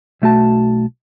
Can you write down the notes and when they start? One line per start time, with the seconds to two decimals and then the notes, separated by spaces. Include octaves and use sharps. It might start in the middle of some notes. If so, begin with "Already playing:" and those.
0.22 B1 A3 F#4 A5